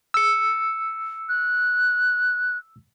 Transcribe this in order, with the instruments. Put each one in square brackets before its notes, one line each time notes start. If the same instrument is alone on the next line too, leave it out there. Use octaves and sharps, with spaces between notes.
[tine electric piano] E6 C#7
[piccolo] F#6